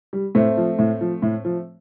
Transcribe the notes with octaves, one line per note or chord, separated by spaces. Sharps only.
G3
A2 A3 C4
F3
A2
F3
A2
F3